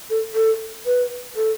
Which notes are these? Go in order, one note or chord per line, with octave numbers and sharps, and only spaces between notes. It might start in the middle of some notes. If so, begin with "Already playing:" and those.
A4
A4
B4
A4